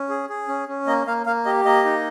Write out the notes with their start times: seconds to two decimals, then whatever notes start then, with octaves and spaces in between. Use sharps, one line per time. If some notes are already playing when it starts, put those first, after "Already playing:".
Already playing: C#4
0.09 G#4
0.30 G#4
0.48 C#4
0.68 C#4
0.87 A#3 D#5
1.06 A#3 F5
1.26 A#3 F5
1.45 G4 D#5
1.65 A#3 D#5
1.85 D#4